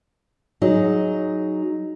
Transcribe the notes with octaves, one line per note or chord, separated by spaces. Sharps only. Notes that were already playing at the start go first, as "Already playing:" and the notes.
F#3 D#4 G#4